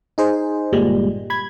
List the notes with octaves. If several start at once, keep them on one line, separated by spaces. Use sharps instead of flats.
D#4 G#4 C5
G1 A#2 G3 G#3
B5 G#6